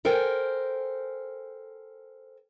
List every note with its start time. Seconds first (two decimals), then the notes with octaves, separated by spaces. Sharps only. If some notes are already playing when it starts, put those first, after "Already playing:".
0.05 A4 A#4 C5 G5 G#5